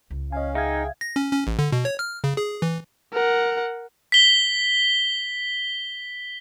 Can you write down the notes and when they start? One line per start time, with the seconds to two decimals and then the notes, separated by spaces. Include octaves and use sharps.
0.10 C#2
0.32 C#4 D#5 F5 G#5
0.55 D#4 G#4 E5 F5 G5 G#6
1.01 A#6
1.16 C#4
1.32 C#4
1.47 A1
1.59 D3
1.72 B2
1.85 C#5
1.99 F6
2.24 C#3
2.37 G#4
2.62 E3
3.13 A#4 F#5
4.12 B6 G7